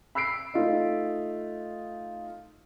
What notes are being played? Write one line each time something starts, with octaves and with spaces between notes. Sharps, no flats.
B5 E6 B6 C7 D7
A3 D#4 F4 D#5